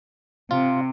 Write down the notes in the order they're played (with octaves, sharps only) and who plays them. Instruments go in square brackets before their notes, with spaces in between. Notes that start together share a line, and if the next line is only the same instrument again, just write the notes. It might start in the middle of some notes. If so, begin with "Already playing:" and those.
[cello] C3 [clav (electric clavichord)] F4